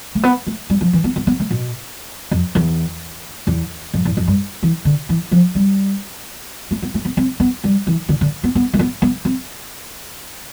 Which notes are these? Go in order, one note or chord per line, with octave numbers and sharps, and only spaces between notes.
A3
B3
A3
G3
F3
E3
B3
B3
B3
A3
B2
F2
E2
E2
F2
E2
F2
G2
E3
D3
E3
F3
G3
A3
B3
A3
B3
C4
B3
G3
E3
D3
D3
B3
B3
A3
B3
B3
C4